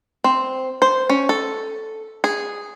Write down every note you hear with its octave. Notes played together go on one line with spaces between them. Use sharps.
C4
C5
C#4
A4
G#4